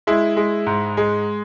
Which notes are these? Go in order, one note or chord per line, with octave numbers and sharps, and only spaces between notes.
G#3 E4
G#3
G#2
G#3